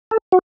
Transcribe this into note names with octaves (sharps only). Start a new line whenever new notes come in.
A4
F#4